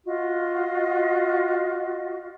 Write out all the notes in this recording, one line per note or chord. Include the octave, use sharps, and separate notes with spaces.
F4 F#4 D#5